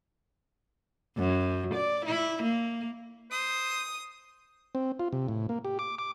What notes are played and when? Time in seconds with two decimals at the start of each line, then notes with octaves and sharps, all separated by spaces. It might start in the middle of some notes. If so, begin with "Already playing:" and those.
1.17 F#2
1.74 D5
2.06 E4
2.43 A#3
3.31 C5 D#6
4.75 C4
4.99 F4
5.13 C3
5.28 A2
5.49 A#3
5.65 G4
5.79 D6
5.99 D6